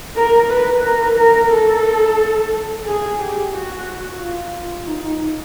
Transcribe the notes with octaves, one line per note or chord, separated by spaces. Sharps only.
A#4
B4
A#4
A#4
A4
G#4
G4
F#4
F4
D#4